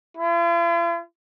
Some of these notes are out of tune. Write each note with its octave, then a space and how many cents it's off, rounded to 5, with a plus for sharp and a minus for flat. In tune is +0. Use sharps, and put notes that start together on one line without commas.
F4 -45